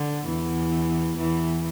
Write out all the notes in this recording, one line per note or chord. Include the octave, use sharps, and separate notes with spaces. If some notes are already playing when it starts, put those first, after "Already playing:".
Already playing: D3
E2 E3
E2 E3